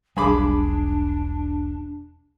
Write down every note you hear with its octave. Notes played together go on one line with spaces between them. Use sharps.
E1 B1 G3 D4 G#4 B5 D6